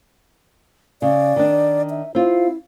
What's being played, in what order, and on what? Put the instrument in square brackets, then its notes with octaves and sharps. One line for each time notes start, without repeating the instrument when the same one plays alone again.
[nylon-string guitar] C#3 [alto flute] D5
[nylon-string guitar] D#3 D4
[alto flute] E5
[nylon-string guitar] C4 F4 [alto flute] E4